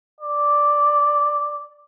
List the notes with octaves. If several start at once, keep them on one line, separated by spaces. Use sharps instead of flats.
D5